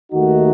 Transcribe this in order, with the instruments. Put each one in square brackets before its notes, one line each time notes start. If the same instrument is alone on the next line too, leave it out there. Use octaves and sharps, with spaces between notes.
[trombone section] D#2 D#3 A3 D#4 F#4